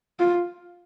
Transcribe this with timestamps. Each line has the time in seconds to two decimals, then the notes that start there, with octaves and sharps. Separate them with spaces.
0.19 F4